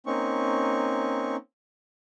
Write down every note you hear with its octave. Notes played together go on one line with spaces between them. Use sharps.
A#3 C4 C#4 D#4 C#6